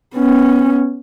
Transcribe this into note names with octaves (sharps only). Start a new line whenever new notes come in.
B3 C#4